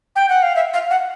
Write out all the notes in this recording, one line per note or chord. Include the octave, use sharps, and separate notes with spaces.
G5
F#5
F5
E5
F5
F#5